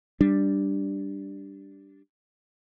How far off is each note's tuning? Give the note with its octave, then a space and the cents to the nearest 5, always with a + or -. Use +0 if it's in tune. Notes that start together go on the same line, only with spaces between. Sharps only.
G3 +0 D4 -5